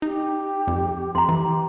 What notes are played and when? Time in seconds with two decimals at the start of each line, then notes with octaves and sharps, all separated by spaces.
0.02 D#4 G4
0.67 F2
1.15 F2 A#5 C6
1.29 E3 G4